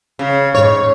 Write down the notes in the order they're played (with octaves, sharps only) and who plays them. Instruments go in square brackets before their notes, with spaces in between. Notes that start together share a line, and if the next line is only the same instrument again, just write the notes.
[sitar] C#3
[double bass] G#2 [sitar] C#5